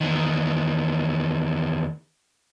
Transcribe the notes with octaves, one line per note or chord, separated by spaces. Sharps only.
E2 D#3